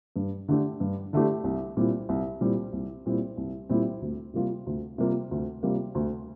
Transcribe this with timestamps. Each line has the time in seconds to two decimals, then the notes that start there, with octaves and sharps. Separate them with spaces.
0.16 G2
0.48 D3 A3 D4 G4
0.80 G2
1.13 D3 A3 D4 G4
1.44 C2
1.77 A#2 G3 C4 E4
2.09 C2
2.41 A#2 G3 C4 E4
2.73 C2
3.06 A#2 G3 C4 E4
3.37 C2
3.69 A#2 G3 C4 E4
4.01 D2
4.34 C3 G3 A#3 F4
4.66 D2
4.98 C3 G3 A#3 F4
5.31 D2
5.63 C3 G3 A#3 F4
5.95 D2